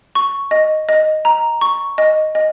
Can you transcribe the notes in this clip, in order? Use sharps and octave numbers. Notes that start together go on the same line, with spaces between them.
C#6
D#5
D#5
A#5
C#6
D#5
D#5